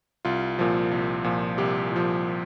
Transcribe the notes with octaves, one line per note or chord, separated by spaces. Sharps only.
C2 F4
A#2 F3
C2
A#2 F3
C2 G4
A#2 F3